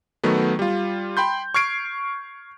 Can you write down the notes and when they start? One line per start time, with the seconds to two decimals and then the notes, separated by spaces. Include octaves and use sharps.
0.23 D#3 F#3 A3 B3
0.59 G3 F4
1.17 G5 B5 C6 G6
1.54 C#6 F6 G#6 C7 D7